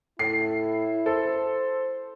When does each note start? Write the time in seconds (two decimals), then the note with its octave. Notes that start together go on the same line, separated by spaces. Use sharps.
0.19 A2 E4 C7
1.06 A4 C5